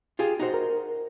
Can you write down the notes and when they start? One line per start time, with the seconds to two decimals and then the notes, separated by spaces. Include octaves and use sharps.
0.19 F4 G4 G#4
0.40 D#4 F#4 C5
0.54 A#4